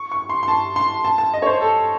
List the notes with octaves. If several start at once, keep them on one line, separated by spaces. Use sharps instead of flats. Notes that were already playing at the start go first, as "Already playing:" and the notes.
Already playing: C#6
C#6
C6
C6
A5
C6
A5
A5
D#5
C#5
C5
A4